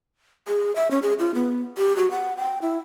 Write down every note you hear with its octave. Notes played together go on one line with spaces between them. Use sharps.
G#4
E5
C#4
G#4
F4
B3
G4
F#4
F#5
G5
E4